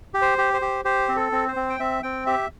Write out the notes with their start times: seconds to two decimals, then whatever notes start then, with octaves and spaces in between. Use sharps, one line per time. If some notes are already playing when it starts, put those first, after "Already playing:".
0.14 G4
0.22 C5
0.38 G4
0.54 C5
0.61 G4
0.85 G4 C5
1.09 C4
1.16 A4
1.32 C4
1.48 C5
1.56 C4
1.70 G5
1.80 C4 E5
2.03 C4 G5
2.26 G4 E5